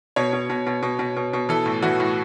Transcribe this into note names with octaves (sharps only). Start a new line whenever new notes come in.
B2 C#5
B2
B2
B2
B2
B2
B2
B2
E3 A4
A2
E3 F#4
A2